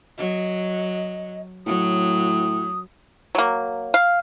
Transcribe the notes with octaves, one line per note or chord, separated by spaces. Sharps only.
F#3 D#5
A2 F#3 D#6
F#3 A#3
F5